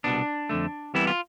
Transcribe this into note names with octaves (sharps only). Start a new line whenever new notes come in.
C2 B2 B3 D4
F2 D3 A3
C2 C3 E3 G3 B3 E4
F4